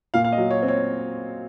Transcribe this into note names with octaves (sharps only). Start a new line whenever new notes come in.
A#2 F5
F5
D#5
F#3
C#5
C4
C#5